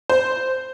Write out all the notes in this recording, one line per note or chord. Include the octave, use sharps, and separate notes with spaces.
C5